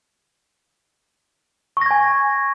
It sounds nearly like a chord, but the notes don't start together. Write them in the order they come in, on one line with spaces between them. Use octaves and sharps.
C#6 A#6 G#6 G#5